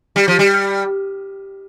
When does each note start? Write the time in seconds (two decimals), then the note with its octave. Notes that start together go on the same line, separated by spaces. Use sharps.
0.16 G3
0.28 F3
0.39 G3